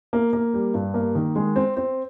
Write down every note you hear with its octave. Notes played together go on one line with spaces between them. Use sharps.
A#3
A#3
G3
G2
A#3
D#3
G#3
C4
C4